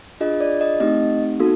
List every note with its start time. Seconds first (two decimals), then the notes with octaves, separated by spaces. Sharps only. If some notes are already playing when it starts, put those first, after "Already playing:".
0.21 D4 F4 G#4 D#5
0.40 D5
0.61 D#5
0.80 A3 C4 D#4 G4 D#5
1.40 B3 D#4 F#4 A4